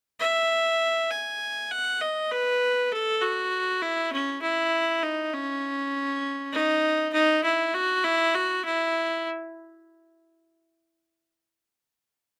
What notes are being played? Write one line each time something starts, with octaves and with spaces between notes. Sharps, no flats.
E5
G#5
F#5
D#5
B4
A4
F#4
E4
C#4
E4
D#4
C#4
D#4
D#4
E4
F#4
E4
F#4
E4